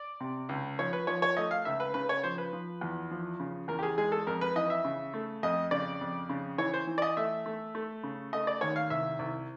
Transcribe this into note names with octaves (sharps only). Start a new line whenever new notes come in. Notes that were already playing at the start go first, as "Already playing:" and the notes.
Already playing: D5
C3
C#2
F3 C#5
B4
F3 C#5
C#5
A3 D#5
F5
C#2 E5
B4
C#3 B4
C#5
F3 C5
B4
F3
E2
F3
C#3
E2 A#4
G4
G#4
G#3 G#4
A4
F2 A#4
B4
E3 D#5
E5
C#3
A3
F2 D#5
C#3 D5
F2
C#3
E3 C#5
C5
E3
D5
D#5
A3 E5
A3
A3
C#3
A3 D#5
D5
D#2 C#5
F5
C2 E5
C2